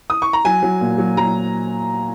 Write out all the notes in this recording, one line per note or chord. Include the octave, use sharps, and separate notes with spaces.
D#6
C#6
A#5
F#3 G#5
F#3
A#2
F#3
F#3 A#5